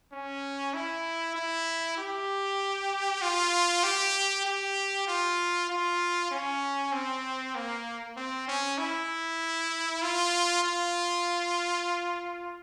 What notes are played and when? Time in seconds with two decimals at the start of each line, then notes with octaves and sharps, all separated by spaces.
0.13 C#4
0.74 E4
1.36 E4
1.98 G4
3.22 F4
3.83 G4
4.45 G4
5.07 F4
5.69 F4
6.31 C#4
6.92 C4
7.55 A#3
8.16 C4
8.48 C#4
8.78 E4
10.02 F4
10.63 F4